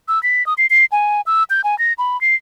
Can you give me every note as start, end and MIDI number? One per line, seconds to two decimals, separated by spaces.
0.08 0.22 88
0.23 0.45 95
0.46 0.54 87
0.58 0.67 96
0.70 0.85 96
0.92 1.21 80
1.26 1.43 88
1.50 1.61 91
1.64 1.78 80
1.79 1.93 94
1.98 2.20 83
2.21 2.35 96